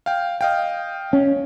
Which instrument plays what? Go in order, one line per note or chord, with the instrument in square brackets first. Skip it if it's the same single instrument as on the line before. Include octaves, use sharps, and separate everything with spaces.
[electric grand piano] F5 G5
D#5 F5 G5
[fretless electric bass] C#4